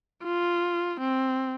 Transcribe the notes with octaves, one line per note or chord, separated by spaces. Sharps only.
F4
C4